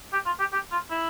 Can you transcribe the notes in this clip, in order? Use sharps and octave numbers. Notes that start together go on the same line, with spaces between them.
G4
F4
G4
G4
F4
E4